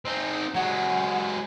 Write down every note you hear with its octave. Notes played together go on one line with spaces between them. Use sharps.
C4 D#4
F#3 G#3 F#5